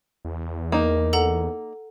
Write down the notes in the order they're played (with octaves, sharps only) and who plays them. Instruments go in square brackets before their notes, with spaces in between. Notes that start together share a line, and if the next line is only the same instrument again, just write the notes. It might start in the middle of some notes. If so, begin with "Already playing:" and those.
[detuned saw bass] E2
[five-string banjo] A#3 D#4
[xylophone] A4 F#5 A#5